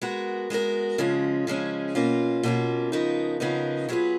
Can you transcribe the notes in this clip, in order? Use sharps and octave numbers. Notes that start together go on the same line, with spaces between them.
G#3 B3 F#4 A#4
G#3 B3 F#4 A#4
C#3 F3 G#3 C#4
C#3 F3 G#3 C#4
B2 A#3 C#4 F4
B2 A#3 C#4 F4
C#3 F3 B3 D#4 A#4
C#3 F3 B3 D#4 A#4
F#3 B3 F4 G#4 B4